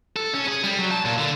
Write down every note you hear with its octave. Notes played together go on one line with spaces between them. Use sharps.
A4
C#4
G#4
G3
F#3
A5
A#2
D3